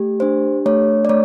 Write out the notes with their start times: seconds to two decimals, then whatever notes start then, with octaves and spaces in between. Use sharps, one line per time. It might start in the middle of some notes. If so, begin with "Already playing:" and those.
Already playing: A3 G4
0.20 D4 C5
0.66 A3 C#5
1.05 D5
1.09 A3 C#5